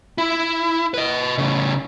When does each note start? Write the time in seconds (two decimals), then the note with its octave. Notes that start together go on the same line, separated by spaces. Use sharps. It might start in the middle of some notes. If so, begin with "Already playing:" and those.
0.18 E4
0.94 B4 D#5
1.38 A2 C#3